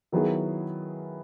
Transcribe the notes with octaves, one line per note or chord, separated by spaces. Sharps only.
D#3 F#3 B3 E4 G#4